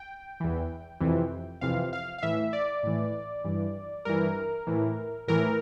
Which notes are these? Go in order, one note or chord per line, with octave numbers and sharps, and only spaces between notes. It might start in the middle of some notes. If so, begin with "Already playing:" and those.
Already playing: G5
E2 E3
F2 C3 E3
F2 C3 E3 F5
F5
F5
A2 E3 E5
D5
A2 E3
G2 E3
G2 E3 A#4
A2 E3
A2 E3 A#4